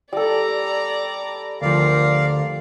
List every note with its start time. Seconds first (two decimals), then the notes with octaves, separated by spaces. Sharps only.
0.13 G3 A4 D5 A#5
1.62 D2 F3 A#4 D5 F5